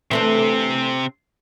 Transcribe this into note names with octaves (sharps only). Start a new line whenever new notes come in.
C3 E3 A3 C4 D4